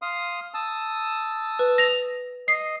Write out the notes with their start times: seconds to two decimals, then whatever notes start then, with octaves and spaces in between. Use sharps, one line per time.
0.02 F5 C6 D#6
0.54 A5 D#6 E6
1.59 B4
1.78 A#6 F7
2.48 D#5 C7